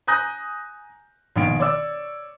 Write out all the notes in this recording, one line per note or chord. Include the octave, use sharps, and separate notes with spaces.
G#5 A#5 D#6 F#6 G6 A#6
A#1 B2 D#3 D7
C#5 D5 D6 E6